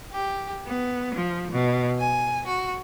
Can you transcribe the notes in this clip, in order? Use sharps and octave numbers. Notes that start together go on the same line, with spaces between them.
G4
B3
F3
B2
G#5
F#4